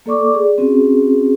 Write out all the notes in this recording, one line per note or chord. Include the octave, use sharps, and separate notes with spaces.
A#3 A4 D5 C#6 D6
G#4 D5
C4 C#4 F#4 G#4